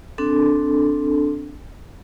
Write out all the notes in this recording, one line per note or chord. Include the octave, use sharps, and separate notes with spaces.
C4 D4 A4